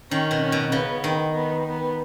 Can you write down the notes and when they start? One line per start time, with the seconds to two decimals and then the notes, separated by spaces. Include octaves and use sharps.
0.11 D#3 C#4
0.31 B2
0.42 C#4
0.52 B2
0.72 C#3 B3
1.04 D#3
1.34 B3
1.66 B3